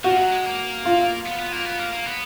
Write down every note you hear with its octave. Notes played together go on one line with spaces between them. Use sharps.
F3 F#4
F#3
G#3
A#3
F4
B3
B3
A#3
B3
A#3
A#3
B3